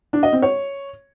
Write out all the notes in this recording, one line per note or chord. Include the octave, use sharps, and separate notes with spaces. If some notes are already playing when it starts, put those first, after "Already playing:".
D4
D#5
C4
C#5